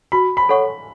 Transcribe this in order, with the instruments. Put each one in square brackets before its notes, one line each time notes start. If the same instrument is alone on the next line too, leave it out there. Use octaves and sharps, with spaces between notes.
[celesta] F#4 [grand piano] B5
[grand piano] B5
[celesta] A4 C#5 F#5 C#6